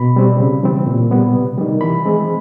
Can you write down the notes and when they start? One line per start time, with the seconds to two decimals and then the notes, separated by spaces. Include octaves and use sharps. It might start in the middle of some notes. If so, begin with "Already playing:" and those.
Already playing: B2 B5
0.16 G3 C4
0.40 C#3
0.63 E3 G3 C4
0.87 A#2
1.11 G3 B3
1.34 C3
1.58 D#3 G3
1.81 E3 B5
2.06 G#3 C4